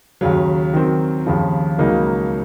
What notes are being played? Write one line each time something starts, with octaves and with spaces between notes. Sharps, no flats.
D#2 C#3 F#3
D#3 F#3 C4
D#2 C#3 F3
C#2 C#3 F#3 A#3 D#4